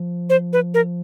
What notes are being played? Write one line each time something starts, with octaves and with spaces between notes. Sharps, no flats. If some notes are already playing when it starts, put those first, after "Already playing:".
Already playing: F3
C5
B4
A#4